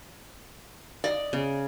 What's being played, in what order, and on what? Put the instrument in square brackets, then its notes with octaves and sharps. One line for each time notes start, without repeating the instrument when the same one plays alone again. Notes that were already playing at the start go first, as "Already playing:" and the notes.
[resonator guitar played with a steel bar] D5 D#5
[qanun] C#3